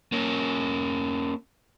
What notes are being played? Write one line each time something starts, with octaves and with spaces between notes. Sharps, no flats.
A#3 C#4